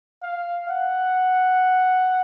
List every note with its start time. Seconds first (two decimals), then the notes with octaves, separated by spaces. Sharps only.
0.22 F5
0.69 F#5